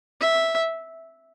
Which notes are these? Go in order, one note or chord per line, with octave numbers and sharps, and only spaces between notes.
E5